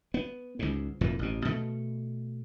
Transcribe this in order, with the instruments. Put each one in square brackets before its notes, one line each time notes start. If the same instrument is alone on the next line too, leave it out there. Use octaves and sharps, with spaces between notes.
[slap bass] B3
C#2 G#2
F1 F2 A#2 E3
A1 B2
B2 A3